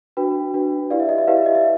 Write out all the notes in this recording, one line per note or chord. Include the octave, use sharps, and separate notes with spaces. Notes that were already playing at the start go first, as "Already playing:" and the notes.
D4 F#4 B4 G5
D4 F#4 B4
E4 G4 B4 D5 F5
E5
D#5
E5
E4 G4 B4 D5 F5
E5
D#5
E5